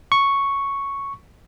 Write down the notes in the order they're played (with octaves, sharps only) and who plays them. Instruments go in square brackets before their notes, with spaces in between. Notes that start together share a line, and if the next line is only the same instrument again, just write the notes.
[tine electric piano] C#6